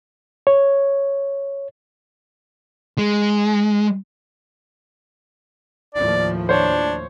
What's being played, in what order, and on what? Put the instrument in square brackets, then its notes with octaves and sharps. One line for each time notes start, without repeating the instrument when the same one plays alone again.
[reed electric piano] C#5
[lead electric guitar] G#3
[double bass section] D#2 A2 F3 [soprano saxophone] D5
[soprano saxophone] D4 [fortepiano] C5 C#5